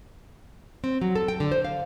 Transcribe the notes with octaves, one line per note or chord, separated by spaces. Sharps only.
C4
F#3
A4
G5
D3
C5
F5